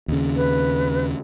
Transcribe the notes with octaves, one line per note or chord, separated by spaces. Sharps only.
D#2 C#3
B4